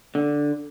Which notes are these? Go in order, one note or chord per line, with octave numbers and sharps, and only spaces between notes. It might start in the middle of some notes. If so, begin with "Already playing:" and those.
D3